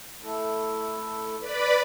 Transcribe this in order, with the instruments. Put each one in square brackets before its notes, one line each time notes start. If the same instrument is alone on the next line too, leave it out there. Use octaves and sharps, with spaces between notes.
[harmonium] A3 E4 A4
[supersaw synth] B4 D5 B5